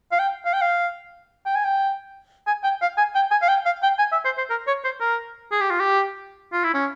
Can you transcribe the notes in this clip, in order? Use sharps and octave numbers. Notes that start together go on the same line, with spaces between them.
F5
G5
F5
G5
F5
G5
G#5
G5
G#5
G5
F5
G#5
G5
G#5
F5
G5
F5
G5
G#5
E5
C5
C5
A#4
C#5
C5
A#4
G#4
G4
F4
G4
F4
E4
C#4